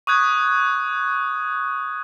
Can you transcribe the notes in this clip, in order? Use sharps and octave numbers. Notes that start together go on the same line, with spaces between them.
C#6 D#6 F#6 G#6